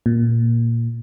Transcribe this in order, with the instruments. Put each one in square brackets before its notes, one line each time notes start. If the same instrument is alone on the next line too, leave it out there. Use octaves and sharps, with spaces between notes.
[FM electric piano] A#2